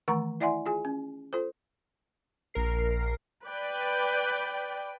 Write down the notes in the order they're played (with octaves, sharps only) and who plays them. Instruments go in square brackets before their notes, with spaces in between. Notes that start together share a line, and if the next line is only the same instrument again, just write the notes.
[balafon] D#3 E3 A3 F#5 A#5 C#6
E4 D5 E5 F#5 G#5 C6
F4 G#4 G#5
C#4
F4 A4 C5
[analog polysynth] A#1 A#4 C7
[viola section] B4 D5 G5